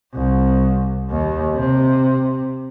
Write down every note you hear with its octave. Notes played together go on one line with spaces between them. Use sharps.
C2
D#2
C3